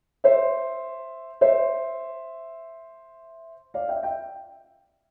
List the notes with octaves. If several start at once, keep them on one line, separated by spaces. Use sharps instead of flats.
C5 E5
C5 E5
D5 F5
E5 G5
E5 G5